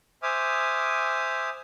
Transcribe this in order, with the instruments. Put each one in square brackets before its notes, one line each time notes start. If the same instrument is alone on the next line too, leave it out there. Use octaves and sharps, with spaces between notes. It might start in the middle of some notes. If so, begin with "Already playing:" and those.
[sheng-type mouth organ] C5 E5 G#5 D6 D#6 F6